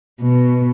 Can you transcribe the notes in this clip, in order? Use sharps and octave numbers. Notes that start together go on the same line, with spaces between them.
B2